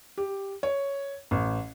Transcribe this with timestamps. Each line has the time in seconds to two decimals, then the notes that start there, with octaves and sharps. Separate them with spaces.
0.18 G4
0.63 C#5
1.31 A1